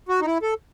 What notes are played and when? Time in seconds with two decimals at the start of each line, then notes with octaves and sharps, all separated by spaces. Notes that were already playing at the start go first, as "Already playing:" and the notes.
0.08 F#4
0.21 D#4
0.26 E4
0.42 A4